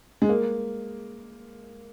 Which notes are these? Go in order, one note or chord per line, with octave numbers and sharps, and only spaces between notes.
G#3
A#3